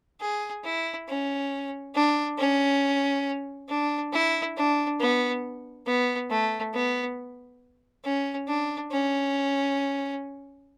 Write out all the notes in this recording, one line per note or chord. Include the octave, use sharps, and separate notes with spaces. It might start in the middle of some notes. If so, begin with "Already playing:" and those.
G#4
E4
C#4
D4
C#4
D4
E4
D4
B3
B3
A3
B3
C#4
D4
C#4